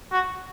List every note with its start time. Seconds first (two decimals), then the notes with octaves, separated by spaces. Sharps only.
0.12 F#4